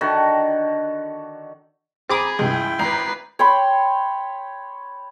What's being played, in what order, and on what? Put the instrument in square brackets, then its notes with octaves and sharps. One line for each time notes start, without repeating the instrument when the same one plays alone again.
[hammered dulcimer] D3 D#3 F#4
[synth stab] C4 D6 D#6 [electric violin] G#4 [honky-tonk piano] A#5 B5 A6
[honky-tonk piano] C#2 [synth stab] G2 C3 G#3 [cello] E4 G5
[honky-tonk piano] G#1 A#5 [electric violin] B4 C7
[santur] C#5 G5 B5 C6